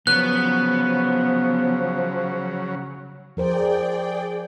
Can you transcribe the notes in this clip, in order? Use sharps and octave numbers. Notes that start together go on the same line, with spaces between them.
C#3 F3 F#3 B3 F#6
F3 G#4 A#4 C5 D5 G5